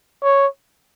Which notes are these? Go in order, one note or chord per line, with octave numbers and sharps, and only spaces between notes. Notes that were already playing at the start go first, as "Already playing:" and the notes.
C#5